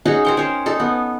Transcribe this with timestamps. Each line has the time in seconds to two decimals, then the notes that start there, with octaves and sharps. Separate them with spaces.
0.05 C#4 D#4 F#4 G#4
0.25 A#4 C5 G5
0.37 C#4 C5
0.66 D#4 A4
0.80 B3